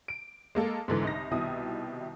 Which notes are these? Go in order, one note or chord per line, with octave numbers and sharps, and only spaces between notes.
D7
G#3 A#3 A4
G#2 D3 E3
C2 D#4 A#6
C2 B2 D#3 E4 D#6